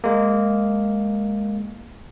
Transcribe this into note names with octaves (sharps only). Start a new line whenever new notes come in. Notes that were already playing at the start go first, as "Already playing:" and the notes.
G#3 A#3